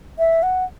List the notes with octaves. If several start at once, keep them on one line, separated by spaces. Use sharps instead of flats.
E5
F#5